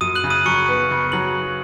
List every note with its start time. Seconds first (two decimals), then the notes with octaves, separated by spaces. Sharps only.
0.01 F#2 D#6 D#7
0.15 F#6 F#7
0.24 C#3
0.30 D#6 D#7
0.46 F#2 C#6 C#7
0.69 B3
0.91 C#3
1.12 F#3 F#7